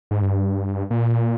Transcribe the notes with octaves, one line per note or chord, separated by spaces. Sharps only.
G#2
G2
A#2